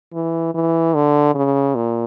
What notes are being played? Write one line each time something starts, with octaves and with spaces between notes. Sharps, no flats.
E3
E3
D3
C#3
A#2